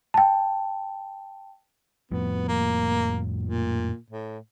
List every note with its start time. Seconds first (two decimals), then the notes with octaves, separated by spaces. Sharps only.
0.14 G5 A5
2.12 F2 A2 F3 B3
2.48 A#3
3.43 A#2
4.10 A2